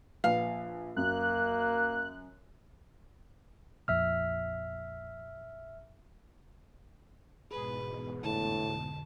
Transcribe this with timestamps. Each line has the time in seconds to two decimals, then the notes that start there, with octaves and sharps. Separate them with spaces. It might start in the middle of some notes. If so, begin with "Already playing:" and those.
0.24 A#1 B4 F5
0.97 F#2 A#3 F#6
3.88 A#1 F2 E5 E6 F6
7.51 E2 G#2 B2 G#4 B4
8.23 F2 A2 D3 A5